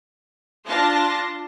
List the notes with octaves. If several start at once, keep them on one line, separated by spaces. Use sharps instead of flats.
D4 F4 A5 C6 A#6